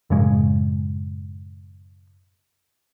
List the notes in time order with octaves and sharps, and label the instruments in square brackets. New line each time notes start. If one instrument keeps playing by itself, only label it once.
[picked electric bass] F#2 A2 C#3 G#3